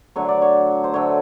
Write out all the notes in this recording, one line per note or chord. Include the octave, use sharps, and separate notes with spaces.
D3 F#3 A3 C#5
D5
C#5
C5
D3 F#3 A3 C#5